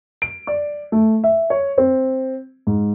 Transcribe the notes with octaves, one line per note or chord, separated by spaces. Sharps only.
D7
D5
A3
E5
C#5
C4
G#2